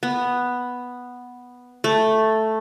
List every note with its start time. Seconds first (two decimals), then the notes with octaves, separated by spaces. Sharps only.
0.03 B3
1.84 A3